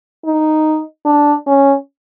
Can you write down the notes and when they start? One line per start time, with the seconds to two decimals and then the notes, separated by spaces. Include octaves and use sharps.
0.25 D#4
1.05 D4
1.47 C#4